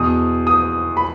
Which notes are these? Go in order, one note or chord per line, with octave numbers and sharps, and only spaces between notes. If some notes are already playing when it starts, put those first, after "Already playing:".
Already playing: E2 B2 D#6
D#6
B5